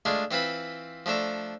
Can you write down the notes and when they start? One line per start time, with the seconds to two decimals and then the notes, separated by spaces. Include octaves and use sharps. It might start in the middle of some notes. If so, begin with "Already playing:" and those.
0.05 G#3 A3 D4 F4 G#4
0.31 E3 C4 F4 B4 B5
1.06 F3 A3 D4 A4 A#5